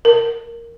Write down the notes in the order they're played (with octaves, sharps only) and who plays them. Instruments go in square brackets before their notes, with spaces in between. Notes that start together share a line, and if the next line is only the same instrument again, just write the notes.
[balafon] A#4